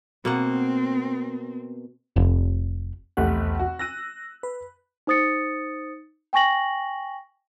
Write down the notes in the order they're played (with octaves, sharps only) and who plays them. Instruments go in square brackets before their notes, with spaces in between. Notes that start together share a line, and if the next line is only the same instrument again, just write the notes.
[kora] B2 A#3 F#5 [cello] C4
[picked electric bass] F1
[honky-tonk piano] F1 A3 G4 [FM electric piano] B1 E2 F#5
[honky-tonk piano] F#4
[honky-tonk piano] E6 F#6 D#7 [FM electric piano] A#6
[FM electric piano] B4
[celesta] D#4 C5 D#6 A6 C#7
G5 G#5 C#6 A#6 F#7